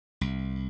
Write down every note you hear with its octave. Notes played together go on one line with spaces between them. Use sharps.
C2